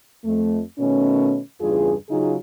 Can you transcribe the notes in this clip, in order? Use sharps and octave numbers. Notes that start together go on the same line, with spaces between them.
F2 A3
B2 D#3 A3 C#4
E2 G2 C#3 F4 G#4
C#3 F#3 C#4 D#4 F4 G#4